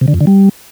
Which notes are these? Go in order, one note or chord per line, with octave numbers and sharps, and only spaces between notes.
C3
D3
F2
D3
G3